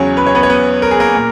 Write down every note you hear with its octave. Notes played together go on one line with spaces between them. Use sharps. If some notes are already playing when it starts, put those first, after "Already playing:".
Already playing: E2 C#3 F#3 C#4 C#5
B4
C#5
B3 B4
C#5
B3 B4
A#4
G#4
A#3 A#4
A#2